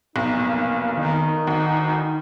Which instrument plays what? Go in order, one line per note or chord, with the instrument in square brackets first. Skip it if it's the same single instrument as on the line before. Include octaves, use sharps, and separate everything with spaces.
[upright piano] F1 B1 [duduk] D#4
[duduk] A#3
[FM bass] D#3 [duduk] D#4
[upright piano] D2